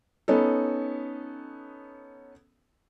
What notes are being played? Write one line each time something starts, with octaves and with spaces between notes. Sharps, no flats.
B3 C#4 D#4 A4